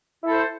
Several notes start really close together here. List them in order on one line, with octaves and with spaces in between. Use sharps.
E4 A4 C5